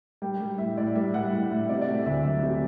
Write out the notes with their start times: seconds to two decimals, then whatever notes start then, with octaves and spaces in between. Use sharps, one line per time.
0.22 G3 G5
0.41 G3
0.58 A2 E5
0.77 A2 D5
0.95 G3 E5
1.14 G3 F#5
1.33 A2
1.51 A2
1.69 C3 D5
1.81 D5
1.88 A3
1.94 E5
2.06 D2 E5
2.25 F#3 E5
2.43 C3